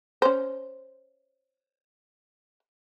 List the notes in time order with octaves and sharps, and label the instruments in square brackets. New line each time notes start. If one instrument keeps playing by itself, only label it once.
[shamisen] C#4 C5